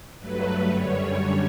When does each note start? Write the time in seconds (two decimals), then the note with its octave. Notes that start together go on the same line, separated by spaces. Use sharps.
0.19 G2 F#3 A3 B4
0.68 F#2 D3 G3 C#5